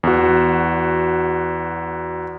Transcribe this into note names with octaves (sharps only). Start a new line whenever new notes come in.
E2 F#4